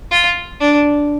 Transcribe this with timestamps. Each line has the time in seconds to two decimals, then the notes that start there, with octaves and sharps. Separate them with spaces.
0.11 F4
0.60 D4